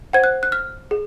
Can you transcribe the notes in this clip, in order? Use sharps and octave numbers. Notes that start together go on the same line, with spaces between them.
C5 F#5 G#6
F#6
F#6
F6
G#4